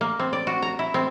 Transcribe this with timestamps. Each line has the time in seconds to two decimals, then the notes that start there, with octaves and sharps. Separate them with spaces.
0.01 A#3
0.19 C4
0.33 D5
0.47 F#4
0.62 A#5
0.79 E4
0.94 C4